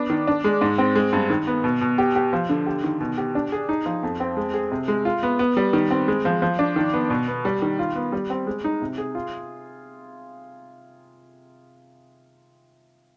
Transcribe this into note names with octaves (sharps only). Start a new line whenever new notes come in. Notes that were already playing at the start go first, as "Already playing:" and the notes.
Already playing: B3 D4
D#3
D4
G#3
G#2
C4
G#3
G2
D#3
B3
B2
B2
G4
G4
F3
D3
G4
D#3
B2
G4
D4
G#4
D#4
F3
F2
C4
G#3
G#4
C3
G#3
F4
B3
B3
G3
D#3
C4
G#3
F3
F3
D4
D#3
B3
B2
B3
G3
D#3
F4
B3
G3
C4
G#3
D#4
C3
G#4
F4